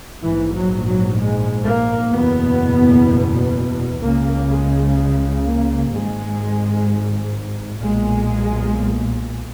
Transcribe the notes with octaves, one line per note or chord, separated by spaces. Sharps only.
A#1 G#2 E3
F#3
F#3
G#3
A#3
F#1 E2 B2 B3
C#2 C#3 A#3
G#3
G#3
A#3
G#1 G#2 G#3
B1 A#2 G#3